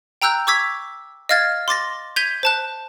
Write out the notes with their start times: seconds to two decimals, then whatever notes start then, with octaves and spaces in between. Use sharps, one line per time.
0.22 G5 A#5 E6 F#6 G6
0.47 C#6 D6 E6 G#6 B6
1.29 D#5 F5 F6 G#6 A6
1.68 C6 D6 A6 A#6
2.16 G6 G#6 B6 D#7 F7 G7
2.43 C5 A5 F#6